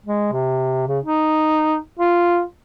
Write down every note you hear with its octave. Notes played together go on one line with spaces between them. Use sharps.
G#3
C3
C#3
D#4
F4